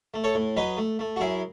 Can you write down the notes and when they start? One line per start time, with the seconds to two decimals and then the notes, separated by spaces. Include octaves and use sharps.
0.14 A3
0.24 A4 C#5
0.34 A2
0.57 F#3 B4 D#5
0.77 A3
0.99 A3
1.16 F#4
1.20 F#2 E4 G#4